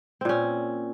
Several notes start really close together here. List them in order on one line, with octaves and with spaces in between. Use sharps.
C4 A#2 C#4